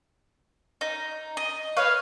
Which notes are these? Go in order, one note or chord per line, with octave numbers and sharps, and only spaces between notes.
D#4
D#5
B4 C#5 F5